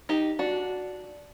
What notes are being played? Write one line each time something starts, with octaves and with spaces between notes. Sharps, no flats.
D#4 G4
D4 F#4